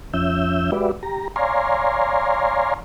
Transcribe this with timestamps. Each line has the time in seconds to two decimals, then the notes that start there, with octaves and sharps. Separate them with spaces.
0.14 F2 F3 C#4 E5 E6 G6
0.72 G#3 F#4 G4 B4 D5 E5
1.03 G4 A#5
1.36 C#5 D5 F5 G#5 A#5 C6